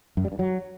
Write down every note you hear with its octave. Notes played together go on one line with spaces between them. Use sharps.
F#2
G3
G2
F#3